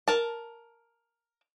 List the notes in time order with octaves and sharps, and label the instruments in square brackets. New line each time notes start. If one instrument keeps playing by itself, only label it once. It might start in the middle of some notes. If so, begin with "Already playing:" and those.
[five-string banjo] A#4 A5